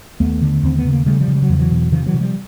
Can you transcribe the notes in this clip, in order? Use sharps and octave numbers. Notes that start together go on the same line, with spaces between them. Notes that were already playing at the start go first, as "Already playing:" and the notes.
D#2 A3 B3
D3
D#2 C4
B3
C#3
A#3
C#3 G3 A3
F3 G3
C#3
G3
F#3
E2 F3
E3 F#3
B2
C3 D#3 F3
E3 F#3
C3
F3 G3